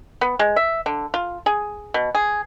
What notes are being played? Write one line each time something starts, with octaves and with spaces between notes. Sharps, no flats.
B3
G#3
E5
D3
F4
G#4
B2
G#4